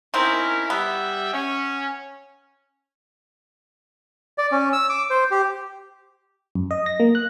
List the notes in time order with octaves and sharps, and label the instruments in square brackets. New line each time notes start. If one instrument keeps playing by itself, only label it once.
[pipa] D#3 C4 [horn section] C#4 E4 A#4
[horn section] G3 E5 [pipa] B3
[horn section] C#4
[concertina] D5
C#4
E6
D6
C5
G4
[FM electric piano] F#2
D#5
A#6
A#3
F#6